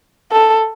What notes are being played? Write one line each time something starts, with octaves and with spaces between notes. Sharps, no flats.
A4